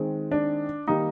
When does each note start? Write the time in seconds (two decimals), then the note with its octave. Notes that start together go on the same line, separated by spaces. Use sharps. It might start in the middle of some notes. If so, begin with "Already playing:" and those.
Already playing: D#3 G#3 C4
0.32 D4
0.88 D#3 G3 A#3 D#4